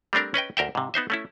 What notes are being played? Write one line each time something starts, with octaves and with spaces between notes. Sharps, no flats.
G3 A3 C4 D4 A#4
C#4 B4 D#5 G5
D2 A#4 E5 G5
G#2 C3
B3 D#4 C5 E5
A3 C#4 E4